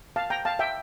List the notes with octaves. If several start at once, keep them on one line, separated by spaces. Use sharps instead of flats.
F5 A5
G5 A#5
F5 A5
E5 G5